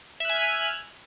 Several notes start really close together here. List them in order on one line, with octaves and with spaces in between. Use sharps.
E5 F#6 G#5 F6